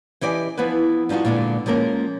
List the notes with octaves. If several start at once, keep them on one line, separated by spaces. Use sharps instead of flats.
E3 G4 D5 D#5 G#5
F3 B3 E4 B4
F3 G3 D#4 F4 F#4
A#2 D3 G#3 B3
F3 G#3 A#3 C#4 A#4